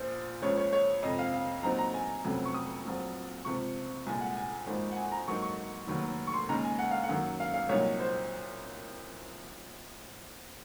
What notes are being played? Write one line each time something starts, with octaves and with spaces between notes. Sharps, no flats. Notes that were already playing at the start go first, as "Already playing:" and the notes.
Already playing: A#1 A#2 F3 C5
C#2 C#3 F3 C#5
C#5
C#5
F2 C3 F3 D#5
F5
F5
A#2 F#3 C4 D#4 A#5
A#5
G#5
F1 F2 C3 F#3 C#4
C#6
D#6
A#1 A#2 F#3 C4
C#2 C3 F3 C#6
C2 A#2 G#3 G#5
F#5
G#5
G#1 G#2 F3 A#3 D#4
F#5
G#5
A#5
G#2 F#3 A#3 D#4 C#6
C#6
F1 D#2 D#3 F#3
C#6
C6
D#2 C#3 G#3 D#4 A#5
G#5
F#5
F5
F#5
F#2 D#3 F#3 A#3
F5
F5
C2 A#2 F#3 A#3 D#4 C#5
C5